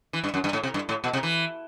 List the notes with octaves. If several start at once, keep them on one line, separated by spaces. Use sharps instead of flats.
E3
G2
F#2
G2
A2
C3
G2
A2
B2
C3
E3